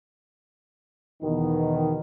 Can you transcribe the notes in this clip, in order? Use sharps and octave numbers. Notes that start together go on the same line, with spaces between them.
E2 B2 D#3